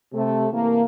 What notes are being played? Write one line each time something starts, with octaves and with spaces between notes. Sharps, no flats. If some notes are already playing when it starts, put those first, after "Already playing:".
C3 A3
C3 E3 A#3